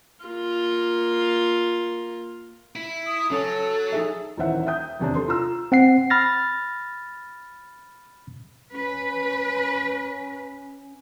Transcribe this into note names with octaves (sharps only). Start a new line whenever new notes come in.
A#3 F4
E4
D#6
F#3 C#4 A4
D#4 G#4 E5
D#1 D#3 E3 C5 E5 F#5
E5 G5 D#6 G6
E1 D#2 C3 D4
A4 C6
F4 A#5 E6
C4 F#5 C7
B5 F6 A6 A#6
C#4 B4